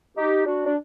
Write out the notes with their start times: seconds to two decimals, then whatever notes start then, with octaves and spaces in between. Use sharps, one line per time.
0.16 D#4 G4
0.46 D4 F#4
0.66 D4